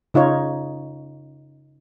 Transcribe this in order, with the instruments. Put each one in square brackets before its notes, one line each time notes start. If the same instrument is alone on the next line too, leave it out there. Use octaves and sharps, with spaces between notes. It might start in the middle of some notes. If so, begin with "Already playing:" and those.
[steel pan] C#3 D#4 F4 C#5